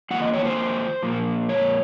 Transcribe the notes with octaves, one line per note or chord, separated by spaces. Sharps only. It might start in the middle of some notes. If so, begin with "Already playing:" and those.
F2 D#3 A#3 F4 F#5
D#5
C#5
C5
A#2 F3 A#3 F4
C#5